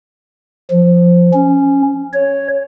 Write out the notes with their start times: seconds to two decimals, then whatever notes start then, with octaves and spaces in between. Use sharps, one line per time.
0.71 F3
1.34 C#4
2.13 C#5